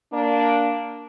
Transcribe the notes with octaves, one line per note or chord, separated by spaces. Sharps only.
A#3 D4